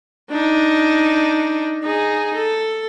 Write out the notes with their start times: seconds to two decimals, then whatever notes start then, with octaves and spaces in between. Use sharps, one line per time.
0.30 D4 D#4
1.83 D#4 G#4
2.35 A4